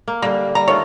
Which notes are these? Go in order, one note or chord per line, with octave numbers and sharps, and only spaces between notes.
A#3
D3 G3 A#3
G3 A#5
D#3 A3 F4 C#5